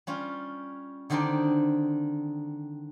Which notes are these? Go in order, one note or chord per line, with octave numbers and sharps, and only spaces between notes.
G3 C#4 F4
D3 D#3 C4 D4 D#4 G4